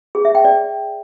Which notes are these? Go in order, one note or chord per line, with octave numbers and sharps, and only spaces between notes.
G#4
E5
G5
D5